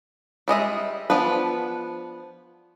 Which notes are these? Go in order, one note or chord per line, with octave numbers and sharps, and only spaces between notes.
G3 G#3 D#5 E5
F3 B3 D4 B4